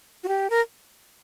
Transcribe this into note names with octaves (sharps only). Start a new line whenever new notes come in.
F#4
G4
A#4